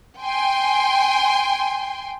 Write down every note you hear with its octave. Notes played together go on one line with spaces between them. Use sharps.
G5 G#5 C6